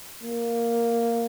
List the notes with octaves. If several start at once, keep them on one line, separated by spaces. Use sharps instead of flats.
A#3